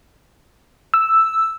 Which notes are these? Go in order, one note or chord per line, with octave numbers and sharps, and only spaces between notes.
E6